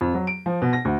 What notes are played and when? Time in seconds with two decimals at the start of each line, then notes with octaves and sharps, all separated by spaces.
0.01 F2
0.14 F#3
0.27 D7
0.46 F3
0.62 B2
0.73 A#6
0.85 D2